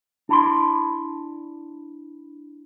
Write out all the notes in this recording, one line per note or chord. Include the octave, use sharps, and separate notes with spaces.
D4 E4 C6